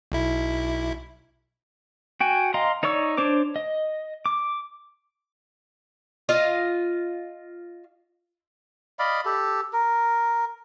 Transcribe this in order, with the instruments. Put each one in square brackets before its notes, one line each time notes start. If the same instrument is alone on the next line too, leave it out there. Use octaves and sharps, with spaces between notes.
[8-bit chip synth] B1 E4
[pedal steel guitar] F#4 G5 G#5
D#5 F5 A#5 C6
D#4 C#5 D5 C#6 E6
D4 C5 C#5 D6
D#5
D6
[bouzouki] F4 D#5 F5
[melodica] D5 D#5 F5 B5
G4 A4
A#4